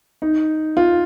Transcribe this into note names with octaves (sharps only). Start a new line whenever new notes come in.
D#4
F4